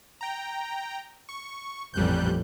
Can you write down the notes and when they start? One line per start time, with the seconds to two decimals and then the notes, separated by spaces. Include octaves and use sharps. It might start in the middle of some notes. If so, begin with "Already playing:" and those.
0.21 G5 A#5
1.29 C#6
1.94 A1 F2 A#2 G3 F#6 G6